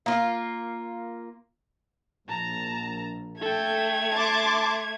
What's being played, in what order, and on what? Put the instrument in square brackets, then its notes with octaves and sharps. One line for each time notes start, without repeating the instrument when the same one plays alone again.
[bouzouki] A#3 F4
[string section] A#1 [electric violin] A5 A#5
[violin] A3 G#6 [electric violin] A4 G5
[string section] A5 C6 D6 [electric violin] A6